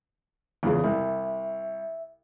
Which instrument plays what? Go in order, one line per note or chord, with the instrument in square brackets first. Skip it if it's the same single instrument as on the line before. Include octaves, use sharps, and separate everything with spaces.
[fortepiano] E2 A#2 C#3
[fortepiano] C2 [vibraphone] E5